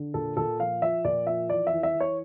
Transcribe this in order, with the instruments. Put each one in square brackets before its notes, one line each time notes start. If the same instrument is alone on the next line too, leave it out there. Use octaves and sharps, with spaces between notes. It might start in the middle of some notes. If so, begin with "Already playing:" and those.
Already playing: [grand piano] D3
A#2 A4
A#2 A4
F3 F5
F3 E5
A#2 D5
F3 E5
E3 D5
E5
E3
E5
E3
C#5